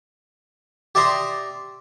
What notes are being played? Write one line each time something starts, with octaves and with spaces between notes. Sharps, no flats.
G4 D5 E5 A#5 C6 D#6